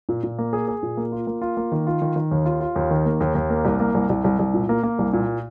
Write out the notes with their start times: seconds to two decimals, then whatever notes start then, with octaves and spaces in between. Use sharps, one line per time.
0.09 A#2
0.23 A#2
0.38 A#3
0.53 G#4
0.68 G#4
0.83 A#2
0.97 A#3
1.12 F4
1.27 A#3
1.42 F4
1.57 A#3
1.72 D#3
1.87 F4
2.02 D#3
2.16 D#3
2.31 D#2
2.45 F4
2.60 F4
2.76 D#2
2.91 D#3
3.05 A#3
3.20 D#2
3.35 D#2
3.50 A#3
3.65 C2
3.80 A#3
3.94 C2
4.09 C2
4.24 C2
4.39 C2
4.54 A#2
4.69 A#3
4.83 A#3
4.98 C2
5.13 A#2